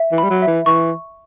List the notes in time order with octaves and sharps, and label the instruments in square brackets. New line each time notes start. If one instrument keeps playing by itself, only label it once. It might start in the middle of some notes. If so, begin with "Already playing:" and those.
Already playing: [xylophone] E5
[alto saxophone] E3
[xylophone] B5
[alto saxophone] G3
F#3
[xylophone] E5
[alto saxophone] E3
[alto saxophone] E3 [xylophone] C#6